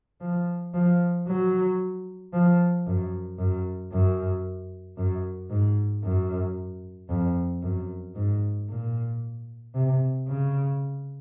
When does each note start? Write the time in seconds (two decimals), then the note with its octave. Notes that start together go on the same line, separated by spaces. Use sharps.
0.21 F3
0.74 F3
1.27 F#3
2.33 F3
2.86 F#2
3.39 F#2
3.93 F#2
4.97 F#2
5.50 G#2
6.04 F#2
7.09 F2
7.63 F#2
8.15 G#2
8.69 A#2
9.75 C3
10.28 C#3